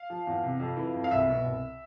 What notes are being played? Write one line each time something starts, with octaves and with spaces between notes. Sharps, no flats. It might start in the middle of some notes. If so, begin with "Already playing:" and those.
Already playing: F5
F3
E2
C3
F2
E3
F2
F5
C2 E5
B2
C2